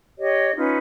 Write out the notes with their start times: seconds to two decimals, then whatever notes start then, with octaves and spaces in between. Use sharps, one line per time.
0.18 G4 C#5 D#5
0.56 C#4 D#4 F4 B4